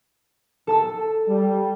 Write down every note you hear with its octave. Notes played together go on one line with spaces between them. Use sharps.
A4 A5 E6
G3